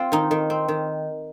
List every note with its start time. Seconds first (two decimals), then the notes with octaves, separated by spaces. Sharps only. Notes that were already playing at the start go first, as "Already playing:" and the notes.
Already playing: C4 F4
0.12 D#3 D#4
0.31 D#3
0.50 C4
0.68 D#3